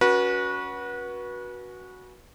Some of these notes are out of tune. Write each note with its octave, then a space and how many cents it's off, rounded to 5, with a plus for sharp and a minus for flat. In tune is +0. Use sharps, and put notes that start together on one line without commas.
C#4 +20 F#4 +0 B4 -30